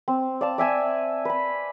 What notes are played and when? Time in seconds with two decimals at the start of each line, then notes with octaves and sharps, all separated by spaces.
0.08 C4
0.41 D5 F5 A5
0.58 D5 E5 G#5 A5
1.25 B4 B5